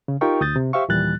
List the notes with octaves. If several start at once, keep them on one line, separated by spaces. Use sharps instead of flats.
C#3
D#4 F4 G4 A#4 G5 C#6
D2 D#6 G6 A6
C3
G4 C5 E5 F5 C#6
D#2 A#2 E3 G3 F#6 A6